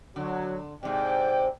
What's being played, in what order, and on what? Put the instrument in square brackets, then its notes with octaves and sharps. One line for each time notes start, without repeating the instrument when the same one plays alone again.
[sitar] D3 [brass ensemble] F#3
[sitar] G#2 C3 [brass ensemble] D5 G5